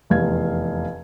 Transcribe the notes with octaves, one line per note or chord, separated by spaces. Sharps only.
F1 E2 F5 G#6